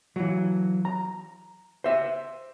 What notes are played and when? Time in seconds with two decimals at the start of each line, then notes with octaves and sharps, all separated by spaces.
0.16 E3 F#3
0.85 A#5
1.84 C5 E5